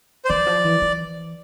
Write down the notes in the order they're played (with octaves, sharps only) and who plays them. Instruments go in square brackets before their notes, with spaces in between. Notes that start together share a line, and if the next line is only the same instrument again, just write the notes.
[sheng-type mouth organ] C5
[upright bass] E3 [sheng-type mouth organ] D5
[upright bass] F3
E3
E3